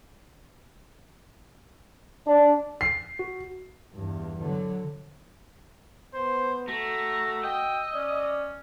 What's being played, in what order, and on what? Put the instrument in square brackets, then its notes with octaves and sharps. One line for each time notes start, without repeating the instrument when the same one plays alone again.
[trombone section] D4
[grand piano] C7
[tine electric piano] F#4
[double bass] E2 G2
D3 F#3
[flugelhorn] B3 [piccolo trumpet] C5
[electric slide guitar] A3 [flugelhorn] F#4 [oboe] A#5 [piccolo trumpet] E6
[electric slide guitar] D#5 [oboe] G5
[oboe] C#4 [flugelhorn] D5